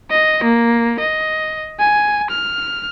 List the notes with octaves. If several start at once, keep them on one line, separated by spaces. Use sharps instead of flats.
D#5
A#3
D#5
G#5
F6